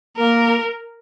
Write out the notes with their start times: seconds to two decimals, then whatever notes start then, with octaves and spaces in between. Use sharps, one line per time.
0.17 A#3 A#4